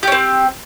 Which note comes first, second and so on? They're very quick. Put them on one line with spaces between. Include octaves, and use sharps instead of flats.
G4 C#4 C4